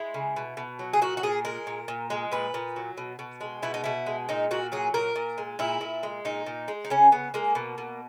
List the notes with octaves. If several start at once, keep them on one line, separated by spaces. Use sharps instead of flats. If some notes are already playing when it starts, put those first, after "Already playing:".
Already playing: G#3 E4
C#3
B2
B2
F#3
G#4
A#2 F#4
F#4
A#2 G#4
G#3 A#4
A#2
A#2
G#3
A#2 B4
A#2
F#3
B2
B2
G#3
B2 E4
D#4
B2 E4
G#3
A#2 D#4
A#2 F#4
F#3 G#4
A#2 A#4
A#2
G#3
A#2 E4
A#2
G#3
A#2 D#4
A#2
G#3
D#4
C#3 C#4
C#3 B3
G#3 A#3
B2
B2